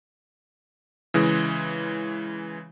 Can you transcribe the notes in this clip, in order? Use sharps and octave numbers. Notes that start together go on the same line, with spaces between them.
C#3 E3 G#3